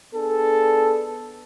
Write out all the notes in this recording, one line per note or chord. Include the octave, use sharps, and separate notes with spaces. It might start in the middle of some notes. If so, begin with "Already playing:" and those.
B3 D4 G#4 A4